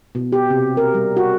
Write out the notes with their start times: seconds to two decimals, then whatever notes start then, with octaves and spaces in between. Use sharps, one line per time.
0.15 B2
0.32 G4
0.50 C3
0.77 A#4
0.94 G3
1.17 F#4